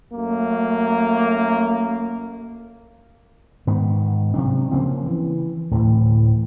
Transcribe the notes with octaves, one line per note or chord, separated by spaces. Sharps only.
F#2 A3 A#3
G#2 D#3 B3
C3 F#3 D4
C#3 F3 A#3 C4
E3
D1 A2 E3